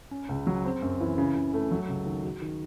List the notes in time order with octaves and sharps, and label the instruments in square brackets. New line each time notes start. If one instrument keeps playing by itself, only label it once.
[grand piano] C#4
C#2
F#3
C4
F#2
E3
C#3
C#3
A3
F#3
C#2
D#3
F#4
D#3